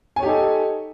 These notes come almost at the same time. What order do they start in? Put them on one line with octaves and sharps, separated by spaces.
G#5 C#5 G4 D#4 A4